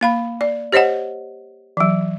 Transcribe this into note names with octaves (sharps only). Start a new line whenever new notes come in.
A#3 F5 B5
D5
G4 C5 C#5 D#5 F#5
E3 F#3